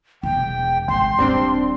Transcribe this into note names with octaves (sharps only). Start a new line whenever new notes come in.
E1 D4 G5
G#1 G#2 G5 C6
D#1 G3 C4 D4